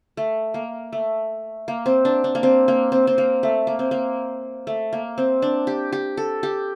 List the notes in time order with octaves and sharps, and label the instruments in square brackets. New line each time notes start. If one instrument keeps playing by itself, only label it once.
[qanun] A3
A#3
A3
A#3
C4
D4
D4
A#3
C4
A#3
C4
C4
A#3
A3
A#3
C4
A#3
A3
A#3
C4
D4
G4
G4
A4
G4